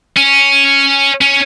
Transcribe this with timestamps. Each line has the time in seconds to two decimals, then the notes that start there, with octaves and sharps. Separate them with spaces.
0.17 C#4
1.21 C#4